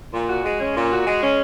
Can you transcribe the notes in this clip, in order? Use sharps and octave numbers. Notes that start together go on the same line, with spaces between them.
A#2
F#4
G#3
C#4
A#2
F#4
G#3
C#4